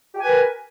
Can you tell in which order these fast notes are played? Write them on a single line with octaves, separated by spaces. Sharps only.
G4 G#5 B4 A#4